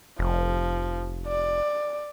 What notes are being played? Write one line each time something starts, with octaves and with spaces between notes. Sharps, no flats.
F1 F3
D5